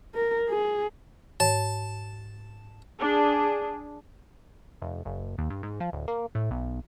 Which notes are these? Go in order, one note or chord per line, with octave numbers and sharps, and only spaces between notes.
A#4
G#4
G#2 C#5 A5
D4 G#4
F1
F#1
D#2
G2
G#2
F3
D1
A#3
A2
B1